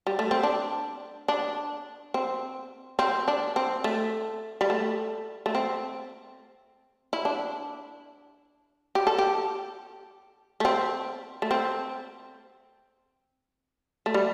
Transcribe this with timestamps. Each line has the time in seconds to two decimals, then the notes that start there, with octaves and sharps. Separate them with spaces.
0.07 G3
0.19 A3
0.31 C4
0.43 D4
1.28 D4
2.14 C4
2.99 C4
3.28 D4
3.56 C4
3.84 A3
4.61 G3
4.70 A3
5.46 A3
5.55 C4
7.13 E4
7.25 D4
8.95 G4
9.07 A4
9.18 G4
10.60 A3
10.65 C4
11.42 A3
11.51 C4
14.06 A3
14.14 G3